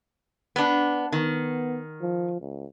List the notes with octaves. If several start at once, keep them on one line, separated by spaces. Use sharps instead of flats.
B3 D4
D#3 B3
F3
C#2